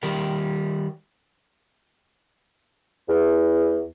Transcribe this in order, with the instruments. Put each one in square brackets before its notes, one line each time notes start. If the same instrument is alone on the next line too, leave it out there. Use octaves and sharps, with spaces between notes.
[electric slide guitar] D#3 G3 A#4
[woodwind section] E2